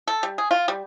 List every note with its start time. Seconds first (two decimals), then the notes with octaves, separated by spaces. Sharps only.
0.08 A4
0.23 G3
0.38 G#4
0.51 F4
0.68 G3